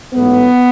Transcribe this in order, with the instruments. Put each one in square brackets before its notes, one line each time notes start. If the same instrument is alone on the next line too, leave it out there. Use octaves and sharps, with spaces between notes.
[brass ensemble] A1 G#2 F#3 A3 B3